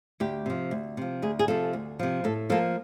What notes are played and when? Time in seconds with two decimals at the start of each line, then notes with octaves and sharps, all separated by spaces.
0.20 D2 G4
0.46 C3 F3
0.71 D2
0.97 C3 F3
1.22 D2 G#4
1.39 G#4
1.48 C3 F3 A4
1.73 D2
1.99 C3 F3
2.24 A2 A4
2.50 F3 A#3 A4